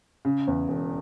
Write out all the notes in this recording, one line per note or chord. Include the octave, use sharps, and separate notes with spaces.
C#3
E2
E1